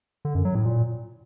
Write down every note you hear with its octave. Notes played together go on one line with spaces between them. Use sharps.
D3
F#2
F#3
A2
A#2